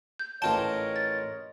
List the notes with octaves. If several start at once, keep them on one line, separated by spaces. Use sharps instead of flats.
G6
A1 F4 A#4 C#5 D#5 G5 A5
A6